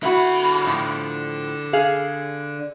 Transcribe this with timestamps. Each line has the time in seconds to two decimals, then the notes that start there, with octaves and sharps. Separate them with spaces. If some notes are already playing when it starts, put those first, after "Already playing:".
0.03 D3 E4 F#4 B5
0.65 A2 F3
1.73 G#4 F5